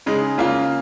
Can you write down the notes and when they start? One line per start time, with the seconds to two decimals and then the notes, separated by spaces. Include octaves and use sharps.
0.06 C#3 G#3 D#4
0.38 C#3 A#3 F4